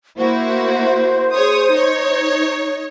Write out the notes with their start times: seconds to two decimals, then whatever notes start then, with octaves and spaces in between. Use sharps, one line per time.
0.19 A#3 E4 F#4 C5
1.33 G#4 C#5 D#6
1.73 D#4 C#5